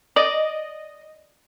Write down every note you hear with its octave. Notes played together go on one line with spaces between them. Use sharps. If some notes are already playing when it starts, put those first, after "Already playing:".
D5 D#5